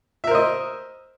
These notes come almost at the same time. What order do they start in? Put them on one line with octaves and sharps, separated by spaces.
E5 A#4 C5 D#5